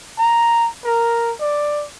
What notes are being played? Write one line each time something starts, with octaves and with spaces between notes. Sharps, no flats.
A#5
A#4
D5